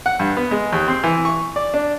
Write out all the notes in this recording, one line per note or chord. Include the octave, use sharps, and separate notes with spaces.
F#5
G2
B3
G#3
D#2
C4
E3
C#6
D5
D4